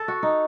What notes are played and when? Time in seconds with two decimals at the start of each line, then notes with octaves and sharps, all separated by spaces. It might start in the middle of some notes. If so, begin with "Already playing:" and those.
Already playing: A4
0.08 F#4
0.23 D#4